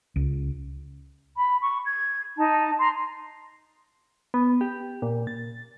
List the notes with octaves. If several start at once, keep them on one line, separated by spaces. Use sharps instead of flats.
C#2
B5
C#6
G#6
D#4 A5
A#5 C6
B3
G4
A#2
A6